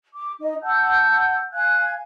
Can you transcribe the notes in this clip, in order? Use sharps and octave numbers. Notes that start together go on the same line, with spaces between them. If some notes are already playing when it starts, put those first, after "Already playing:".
D6
D#4 D#5
F#5 A5 E6 G6
F5 G#5 F#6 G#6